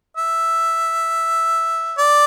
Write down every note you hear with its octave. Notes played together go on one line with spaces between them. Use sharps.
E5
D5